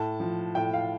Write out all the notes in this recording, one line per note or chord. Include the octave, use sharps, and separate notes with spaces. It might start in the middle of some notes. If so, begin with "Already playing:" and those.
Already playing: A2 A5
F3
A2 G5
F5